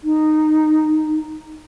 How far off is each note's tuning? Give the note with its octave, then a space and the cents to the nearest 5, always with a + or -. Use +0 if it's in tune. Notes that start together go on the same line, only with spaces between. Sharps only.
D#4 -10